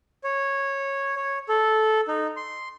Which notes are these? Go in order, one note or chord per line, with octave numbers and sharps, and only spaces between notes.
C#5
C#5
A4
D#4
C6